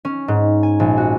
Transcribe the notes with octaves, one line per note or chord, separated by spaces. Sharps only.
C#4
G#2
G#5
A#1
F#4